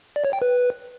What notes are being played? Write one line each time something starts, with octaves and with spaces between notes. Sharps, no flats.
D5
C#5
G5
B4